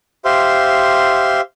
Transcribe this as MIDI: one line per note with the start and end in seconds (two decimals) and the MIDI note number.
0.25 1.41 67
0.25 1.41 72
0.25 1.41 76
0.25 1.41 77
0.25 1.41 84